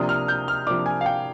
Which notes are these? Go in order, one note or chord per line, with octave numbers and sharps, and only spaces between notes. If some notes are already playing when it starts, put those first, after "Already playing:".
Already playing: C3 F3 A#3 D4 D#6
F6
G6
F6
C3 F3 A#3 D4 D6
G#5
F5
G5